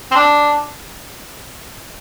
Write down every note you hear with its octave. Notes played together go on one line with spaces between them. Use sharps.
C4
D4